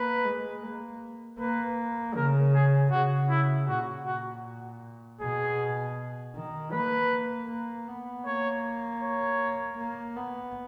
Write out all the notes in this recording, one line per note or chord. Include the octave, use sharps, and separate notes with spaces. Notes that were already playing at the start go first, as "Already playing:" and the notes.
Already playing: A#3 B4
G#3
A#3
A#3 B4
C#3 A#4
G#4
C#3 F#4
E4
A#2 F#4
F#4
B2 G#4
D#3
A#3 B4
A#3
B3
A#3 C#5
C#5
A#3
B3